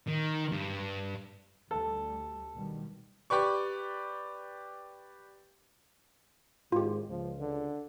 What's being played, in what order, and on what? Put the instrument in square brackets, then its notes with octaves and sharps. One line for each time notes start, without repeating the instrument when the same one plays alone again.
[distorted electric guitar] D#3
G2
[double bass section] D2 G3 [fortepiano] A4
[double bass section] B2 D#3 G3
[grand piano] G4 B4 D5 C#6
[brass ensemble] G#1 G#2 [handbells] F4 G4
[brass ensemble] C#2 [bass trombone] F3
[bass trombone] D3